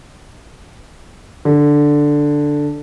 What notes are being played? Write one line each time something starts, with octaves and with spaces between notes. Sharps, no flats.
D3